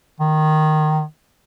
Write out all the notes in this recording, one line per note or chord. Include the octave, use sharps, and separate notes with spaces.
D#3